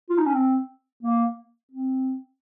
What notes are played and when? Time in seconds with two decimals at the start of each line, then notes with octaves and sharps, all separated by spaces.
0.10 F4
0.18 D#4
0.26 C#4
0.34 C4
1.03 A#3
1.72 C4